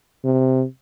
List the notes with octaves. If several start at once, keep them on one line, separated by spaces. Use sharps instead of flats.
C3